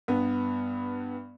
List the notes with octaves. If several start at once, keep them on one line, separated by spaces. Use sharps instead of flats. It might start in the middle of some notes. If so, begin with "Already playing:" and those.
G2 B3